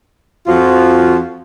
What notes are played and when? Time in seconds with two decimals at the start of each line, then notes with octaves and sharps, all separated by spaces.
0.47 F2 F3 F4 F#4